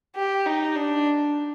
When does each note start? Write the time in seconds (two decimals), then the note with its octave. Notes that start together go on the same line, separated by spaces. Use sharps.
0.16 G4
0.46 D#4
0.76 D4